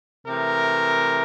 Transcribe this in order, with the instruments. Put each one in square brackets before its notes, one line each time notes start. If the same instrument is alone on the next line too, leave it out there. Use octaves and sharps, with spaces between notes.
[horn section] C3 E3 A3 A#4